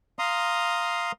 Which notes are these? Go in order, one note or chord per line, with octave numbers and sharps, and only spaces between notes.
F5 A#5 C6 D#6